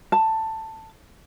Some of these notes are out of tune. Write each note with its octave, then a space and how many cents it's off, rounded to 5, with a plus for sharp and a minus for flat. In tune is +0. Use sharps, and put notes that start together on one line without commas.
A5 +10